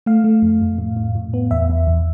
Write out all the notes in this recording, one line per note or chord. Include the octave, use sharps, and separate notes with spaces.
A3 F5
A3
F2
F2
A2
A2
A2
B3
E2 E5
E2
E2